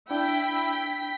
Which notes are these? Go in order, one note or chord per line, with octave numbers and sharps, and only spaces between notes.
D4 E4 G5 B6